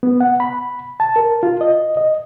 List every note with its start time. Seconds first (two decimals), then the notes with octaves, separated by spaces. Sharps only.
0.03 B3
0.20 F#5
0.40 B5
1.00 A5
1.16 A#4
1.43 F4
1.61 D#5
1.97 D#5